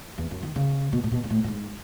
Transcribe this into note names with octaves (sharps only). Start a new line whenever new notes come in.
E2
F#2
D#3
C#3
B2
A2
B2
G#2
A2
A2
G#2